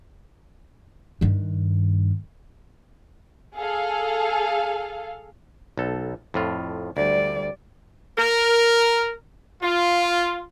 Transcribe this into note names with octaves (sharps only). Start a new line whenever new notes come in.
G2 D#3
G#4 A4 F5
B1 A4
F2 A2 F4
D2 G3 D5
A#4
F4